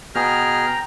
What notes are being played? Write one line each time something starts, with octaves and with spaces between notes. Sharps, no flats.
B2 G#4 G5 A#5 F6